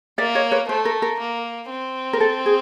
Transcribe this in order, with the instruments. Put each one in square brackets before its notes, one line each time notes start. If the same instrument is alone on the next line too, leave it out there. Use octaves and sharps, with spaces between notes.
[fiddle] A#3 [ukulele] D5 E5
[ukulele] C#5 D#5
B4 C#5
[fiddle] A3 [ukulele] C5
[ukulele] A#4
A#4
[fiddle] A#3
C4
[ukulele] A#4
A4
G#4